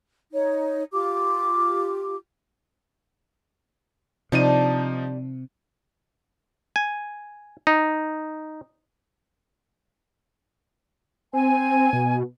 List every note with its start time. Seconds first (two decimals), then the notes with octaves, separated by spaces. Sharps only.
0.32 D#4 C#5
0.92 F4 G4 D6
4.32 C3 F3 G3 D4 D#4 D#7
6.76 G#5
7.67 D#4
11.33 C4 G#5
11.93 B2